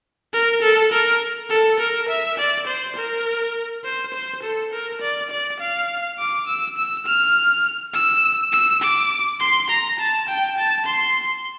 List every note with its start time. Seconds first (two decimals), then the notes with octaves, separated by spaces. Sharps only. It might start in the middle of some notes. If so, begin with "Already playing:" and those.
0.33 A#4
0.62 A4
0.92 A#4
1.50 A4
1.80 A#4
2.09 E5
2.38 D5
2.67 C5
2.96 A#4
3.84 C5
4.14 C5
4.43 A4
4.72 A#4
5.01 D5
5.30 D5
5.60 F5
6.19 D6
6.48 E6
6.77 E6
7.06 F6
7.94 E6
8.52 E6
8.82 D6
9.40 C6
9.69 A#5
9.99 A5
10.28 G5
10.58 A5
10.86 C6